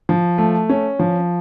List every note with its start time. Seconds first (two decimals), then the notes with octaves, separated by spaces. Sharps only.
0.09 F3
0.38 A3
0.69 C#4
0.99 F3